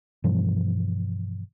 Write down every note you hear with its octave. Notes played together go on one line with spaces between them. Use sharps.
G2 B2 E3 F3